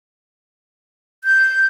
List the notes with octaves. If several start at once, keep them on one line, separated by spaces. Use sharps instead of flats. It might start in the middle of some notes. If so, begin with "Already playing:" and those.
G6